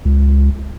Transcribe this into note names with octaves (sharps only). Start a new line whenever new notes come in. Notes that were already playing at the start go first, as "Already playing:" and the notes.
C#2